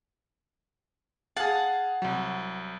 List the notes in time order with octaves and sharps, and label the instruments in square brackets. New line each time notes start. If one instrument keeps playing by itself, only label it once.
[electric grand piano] G#4 F5 [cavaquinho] F#5 A5
[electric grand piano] C2 F#3